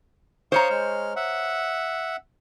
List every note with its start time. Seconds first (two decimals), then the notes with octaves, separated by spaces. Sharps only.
0.52 C5 C#5 F5 A#5 C#6 D#6
0.70 G#3 F6
1.16 E5 F#5